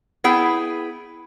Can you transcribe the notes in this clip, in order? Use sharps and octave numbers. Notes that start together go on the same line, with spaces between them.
B3 E4 G#4 G5